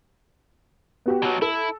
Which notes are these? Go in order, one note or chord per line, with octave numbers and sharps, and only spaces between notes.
B3 F#4 G4
B2 F#3
E4 A4